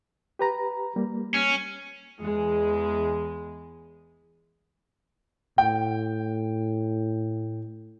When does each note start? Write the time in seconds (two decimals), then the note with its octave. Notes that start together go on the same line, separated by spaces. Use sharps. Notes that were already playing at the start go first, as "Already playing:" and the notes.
0.39 G4 B4 A#5
0.96 G3 A#3
1.34 C#4
2.21 E2 G#3
5.58 A2 G5